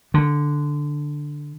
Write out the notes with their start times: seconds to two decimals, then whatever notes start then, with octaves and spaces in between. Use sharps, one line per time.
0.14 D3